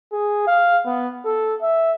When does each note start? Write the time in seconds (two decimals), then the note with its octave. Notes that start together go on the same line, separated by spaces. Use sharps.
0.12 G#4
0.47 F5
0.86 B3
1.25 A4
1.62 E5